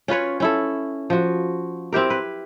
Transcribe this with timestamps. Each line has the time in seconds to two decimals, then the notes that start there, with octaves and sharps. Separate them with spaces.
0.08 C#4 F4 B4 C#5
0.40 C#4 E4 A4
1.10 F3 F#4
1.93 C4 E4 G4 A#4
2.10 B4